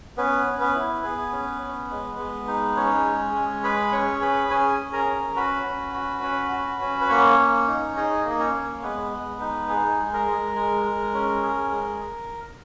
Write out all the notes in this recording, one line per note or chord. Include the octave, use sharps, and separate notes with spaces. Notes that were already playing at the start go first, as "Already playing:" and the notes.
B3 C#4 B4
C#4
B3 B4
E4
B3 G#4 B4
C#4
C#4
G#3
G#3
D#4
C#4 G#4 C#5
G#3
G#3
G#4 B4 B5
C#4 C#5 C#6
G#4 B4 B5
C#4 G#4 G#5
G#4
A#4 A#5
C#4
F#4 B4 B5
C#4
F#4
C#4
F#4
C#4
B4
A#3 C#4 C#5
A#3
D#4
D#4 G#4 D#5
A#3
D#5
C#4 C#5
A#3
G#3 B3 B4
G#3
D#4
G#4
G#3
A#4
G#3
G#3
G#3
C#4
G#4
G#3